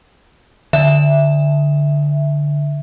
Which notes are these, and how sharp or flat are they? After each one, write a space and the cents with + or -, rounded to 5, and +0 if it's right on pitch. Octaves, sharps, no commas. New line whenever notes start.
D3 -5 E5 +0